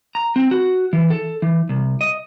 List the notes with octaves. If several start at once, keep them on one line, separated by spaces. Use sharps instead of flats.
A#5
C4
F#4
E3
A4
E3
C2
D#5